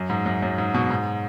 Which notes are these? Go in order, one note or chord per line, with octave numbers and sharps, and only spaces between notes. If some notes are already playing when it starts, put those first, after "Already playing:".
Already playing: F#2
G#2
F#2
F#2
G#2
B2
G#2